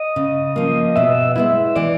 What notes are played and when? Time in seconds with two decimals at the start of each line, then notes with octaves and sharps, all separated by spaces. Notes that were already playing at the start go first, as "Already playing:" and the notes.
Already playing: D#5
0.16 C#3
0.56 F3 A#3
0.96 B2 E5
1.36 G#3 B3 E4 E5
1.76 E3 D5